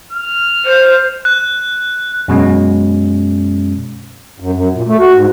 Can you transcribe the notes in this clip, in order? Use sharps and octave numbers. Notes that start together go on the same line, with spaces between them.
F6
C5
F#6
F#2 B2 G#3 C#4
F#2
F#2
A#2
A3
F#4
G#2